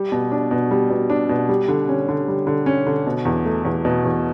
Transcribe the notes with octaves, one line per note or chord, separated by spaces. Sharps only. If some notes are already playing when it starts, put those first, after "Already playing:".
Already playing: G3
B2
D4
B2
G3
B2
D4
B2
G3
D3
C#4
D3
G3
D3
C#4
D3
B2
E2
A3
E2
B2
E2